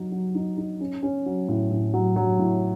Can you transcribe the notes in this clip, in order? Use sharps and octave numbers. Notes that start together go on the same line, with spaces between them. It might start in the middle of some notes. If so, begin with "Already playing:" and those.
Already playing: F#3 D#4
F#3
D#4
D#4
C#4
C#4
F#3
A2
A2
F#3
F#3
A2